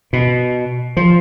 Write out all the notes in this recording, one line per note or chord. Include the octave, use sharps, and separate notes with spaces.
B2
F3